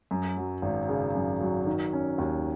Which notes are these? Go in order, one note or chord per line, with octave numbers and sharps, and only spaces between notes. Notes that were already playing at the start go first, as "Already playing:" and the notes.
F#2
F#3
G#1
C#3
F#2
F#3
D#3
C#4
D#2